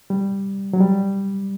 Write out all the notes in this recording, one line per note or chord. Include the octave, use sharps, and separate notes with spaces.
G3
F#3
G3